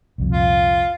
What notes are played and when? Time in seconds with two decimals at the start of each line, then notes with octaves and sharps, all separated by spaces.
0.18 C2 F2 A#2
0.31 F4